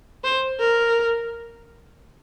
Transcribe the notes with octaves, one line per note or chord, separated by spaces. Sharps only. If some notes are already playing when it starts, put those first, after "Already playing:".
C5
A#4